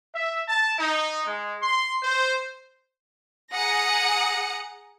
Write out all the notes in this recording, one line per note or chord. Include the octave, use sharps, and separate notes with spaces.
E5
A5
D#4
G#3
C6
C5
G#4 F#5 A#5 D#6 A#6 C#7